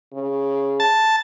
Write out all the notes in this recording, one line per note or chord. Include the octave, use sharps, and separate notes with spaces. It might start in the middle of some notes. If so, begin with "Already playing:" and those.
C#3
A5